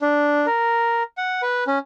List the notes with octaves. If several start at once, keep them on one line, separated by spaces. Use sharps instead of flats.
D4
A#4
F#5
B4
C#4